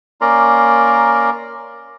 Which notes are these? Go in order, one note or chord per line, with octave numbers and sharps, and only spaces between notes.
A#3 C#4 A#4 D5 A#5 C6